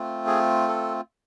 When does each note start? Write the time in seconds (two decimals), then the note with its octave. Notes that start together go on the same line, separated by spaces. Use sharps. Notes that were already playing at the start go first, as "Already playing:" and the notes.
Already playing: A3 C4 F4
0.27 G#4
0.68 A4